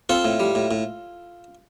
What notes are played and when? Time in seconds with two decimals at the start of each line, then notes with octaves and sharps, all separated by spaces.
0.09 C4 F4 A4
0.25 A2
0.40 G3
0.55 A2
0.71 A2